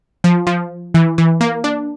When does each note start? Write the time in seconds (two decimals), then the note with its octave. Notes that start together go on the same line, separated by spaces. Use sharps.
0.24 F3
0.47 F3
0.94 E3
1.18 E3
1.41 A#3
1.64 D4